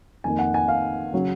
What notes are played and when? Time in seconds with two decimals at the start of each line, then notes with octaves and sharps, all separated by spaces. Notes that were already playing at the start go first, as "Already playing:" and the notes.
0.24 F2 D#3 A#3 D#4 G#5
0.39 F#5
0.54 G#5
0.68 F5
1.12 C#3 F#3 C#4